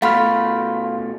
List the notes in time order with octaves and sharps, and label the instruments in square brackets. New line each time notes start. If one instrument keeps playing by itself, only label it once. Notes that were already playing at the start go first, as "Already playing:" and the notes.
[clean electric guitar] B2 A3 [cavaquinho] F#4 B5 [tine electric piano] F5 C6 F6